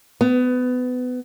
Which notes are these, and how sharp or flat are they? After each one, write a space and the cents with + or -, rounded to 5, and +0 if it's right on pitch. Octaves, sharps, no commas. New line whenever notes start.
B3 +25